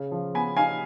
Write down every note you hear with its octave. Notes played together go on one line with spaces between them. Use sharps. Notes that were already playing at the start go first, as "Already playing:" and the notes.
Already playing: C#3
F3
B3 G#5 B5
D#4 F5 G#5